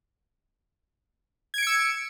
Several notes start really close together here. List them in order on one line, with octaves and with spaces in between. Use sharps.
G#6 D7 C#7 E6